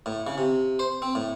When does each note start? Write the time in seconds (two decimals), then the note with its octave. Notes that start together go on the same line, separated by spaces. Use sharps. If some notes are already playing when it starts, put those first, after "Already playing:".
0.06 A2
0.27 C#3
0.38 C3
0.79 C5
1.02 C4
1.15 A2